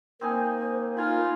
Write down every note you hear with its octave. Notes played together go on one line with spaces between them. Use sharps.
A#3 C4 D#4 C5 G#5
D#4 F4 A#4 G#5 B5